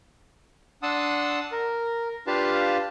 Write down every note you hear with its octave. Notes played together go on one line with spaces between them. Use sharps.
D4 F#5 A5 C6 D#6 E6
A#4
D4 F4 G4 B4 F5 A5